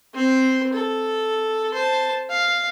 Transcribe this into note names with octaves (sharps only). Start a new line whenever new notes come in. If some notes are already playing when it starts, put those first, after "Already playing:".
C4 C5
A4
C5 A5
F5